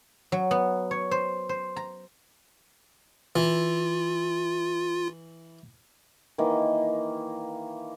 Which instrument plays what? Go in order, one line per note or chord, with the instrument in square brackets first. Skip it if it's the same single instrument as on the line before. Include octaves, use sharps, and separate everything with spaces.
[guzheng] F#3
B3
C#5
C5
C5
A#5
[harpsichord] E3 [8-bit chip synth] F4
[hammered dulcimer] D#3 E3 A#3